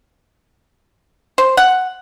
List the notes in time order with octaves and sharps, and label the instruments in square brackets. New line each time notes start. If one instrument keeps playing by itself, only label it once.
[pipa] C5
F#5